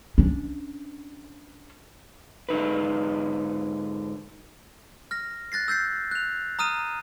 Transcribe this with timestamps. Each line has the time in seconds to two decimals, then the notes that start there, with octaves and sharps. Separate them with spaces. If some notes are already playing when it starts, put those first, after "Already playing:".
0.18 C#4 D4
2.49 G#2 D3 D#4 B4
5.11 F6 A#6
5.52 F#6 A6 A#6 C7
5.68 E6 G6 A6 C7
6.11 F#6 F7
6.59 A#5 D#6 F6 D#7